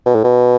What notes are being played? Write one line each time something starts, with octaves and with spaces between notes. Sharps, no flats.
B2
A2
B2